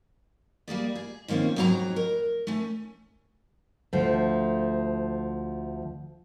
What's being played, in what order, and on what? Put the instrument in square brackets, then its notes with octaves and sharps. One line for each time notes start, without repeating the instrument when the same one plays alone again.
[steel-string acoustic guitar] G3 A#3 G#4 D5
G#4
D#3 F3 A#3 C4 C#4
F2 G#2 F#3 F#4 C#5 A#5
A#4
A3 C#4
[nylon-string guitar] D2 F3